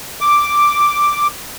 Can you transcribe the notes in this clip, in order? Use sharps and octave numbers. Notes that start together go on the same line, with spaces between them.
D6